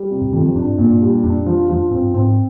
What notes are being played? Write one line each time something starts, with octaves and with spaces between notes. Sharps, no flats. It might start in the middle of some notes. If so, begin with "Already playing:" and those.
Already playing: G3
C3
G2
F2 D#3
F3
G2 D4
G2 A#2
G3
F2 D4
F3
F3
G2 C4
G#2 C4